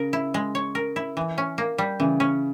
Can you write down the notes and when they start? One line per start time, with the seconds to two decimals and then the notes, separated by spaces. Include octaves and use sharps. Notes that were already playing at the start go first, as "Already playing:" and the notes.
Already playing: C#3 A#4
0.13 E4
0.34 G#3
0.55 C#5
0.75 A#4
0.96 E4
1.17 E3
1.38 C#4
1.58 A#3
1.78 G3
2.00 C#3 E3
2.20 C#4